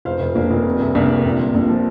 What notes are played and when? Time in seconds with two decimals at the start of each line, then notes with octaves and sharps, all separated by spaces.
0.05 F1 C5 F5
0.20 F1
0.35 F1 A#3 D4
0.51 F1
0.65 C3
0.80 C2
0.95 C2 A#3 D4
1.10 C3
1.25 A#1
1.39 A#2
1.55 A#1 A#3 D4
1.70 F3